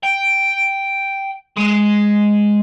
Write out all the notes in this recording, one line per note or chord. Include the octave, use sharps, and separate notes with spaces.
G5
G#3